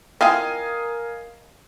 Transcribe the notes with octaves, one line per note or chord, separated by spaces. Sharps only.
C4 E4 F4 A#4 D#5 F5 G#5